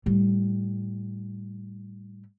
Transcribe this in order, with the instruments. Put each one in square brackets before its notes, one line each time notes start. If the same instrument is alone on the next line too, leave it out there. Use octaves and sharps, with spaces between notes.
[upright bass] A2 G3